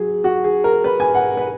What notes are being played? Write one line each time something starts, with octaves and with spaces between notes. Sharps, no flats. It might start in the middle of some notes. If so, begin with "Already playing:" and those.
Already playing: F#3 G#4
F#4
G#4
A#4
B4
G#5
F#5
B4